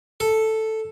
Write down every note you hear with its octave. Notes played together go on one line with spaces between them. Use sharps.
A4